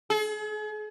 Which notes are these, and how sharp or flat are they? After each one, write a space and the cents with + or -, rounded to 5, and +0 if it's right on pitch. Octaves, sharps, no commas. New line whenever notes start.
G#4 +40